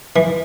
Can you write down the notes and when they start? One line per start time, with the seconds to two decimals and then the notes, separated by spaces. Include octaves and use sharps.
0.16 E3